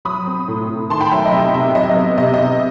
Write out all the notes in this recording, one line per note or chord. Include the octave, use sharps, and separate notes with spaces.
F#3 B5 D#6
C4
A2
A2
D#3 A5 C6
G5 B5
F#3 E5 G5
D#5
C3 E5
C3 E5
F#3 D#5
E5
D#5
B3
C3 D#5
D#5
C3